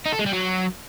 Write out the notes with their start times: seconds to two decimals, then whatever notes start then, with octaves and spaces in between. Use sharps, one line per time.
0.06 D#4
0.12 A4
0.19 G#3
0.26 G3
0.33 F#3